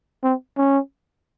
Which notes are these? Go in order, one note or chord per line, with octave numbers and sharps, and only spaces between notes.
C4
C#4